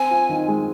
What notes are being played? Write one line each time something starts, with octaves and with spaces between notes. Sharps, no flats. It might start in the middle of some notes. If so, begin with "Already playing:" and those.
Already playing: C4 G#5
F4
D#3
G#3